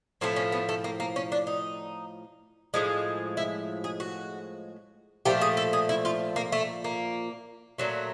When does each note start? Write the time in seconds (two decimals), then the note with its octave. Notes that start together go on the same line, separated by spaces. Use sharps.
0.21 A2 F3 A3 C4
0.36 C#4
0.52 B3
0.69 A3
0.84 A#3
1.00 A#3
1.16 C#4
1.32 D4
1.47 D#4
2.74 A2 F3 G#3
3.37 E4
3.84 G#4
4.00 F#4
5.25 A#2 F3 A3 G4
5.41 G#4
5.57 A4
5.73 G#4
5.89 E4
6.05 F4
6.36 A#3
6.52 A3
6.84 A#3
7.78 A#2 F#3 A3